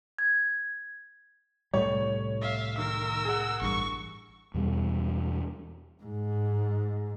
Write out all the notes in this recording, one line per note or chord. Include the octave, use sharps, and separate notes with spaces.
G#6
C2 A2 G3 C#5
E5 F5
D#3 A#4 E6
G#4 F#5
A1 G2 C#6
E2 B2 G3
G#2